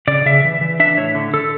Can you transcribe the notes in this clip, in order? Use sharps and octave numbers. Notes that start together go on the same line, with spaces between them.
C#3 D5
C#3 E5
E3
E3
D4 E5
A2 C#5
D3
D3 A4